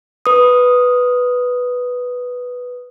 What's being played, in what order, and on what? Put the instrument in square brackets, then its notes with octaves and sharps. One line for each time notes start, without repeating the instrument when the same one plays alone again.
[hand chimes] B4 D#6